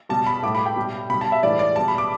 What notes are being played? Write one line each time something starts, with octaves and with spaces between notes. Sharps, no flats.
B2 G3 A5
B5
A2 G3 D6
B5
G5
B2 G3
B2 G3 B5
A5
E5
A2 E3 G3 D5
D5
B2 G3 A5
B5
D6